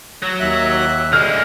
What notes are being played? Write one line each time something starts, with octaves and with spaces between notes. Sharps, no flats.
F#3
D#2 E5 F#6
D3 G#3 F6